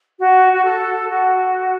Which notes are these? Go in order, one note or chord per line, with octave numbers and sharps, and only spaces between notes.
F#4
F#4
A4
F#4